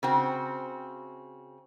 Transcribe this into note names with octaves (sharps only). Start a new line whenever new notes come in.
C#3 C4 F#4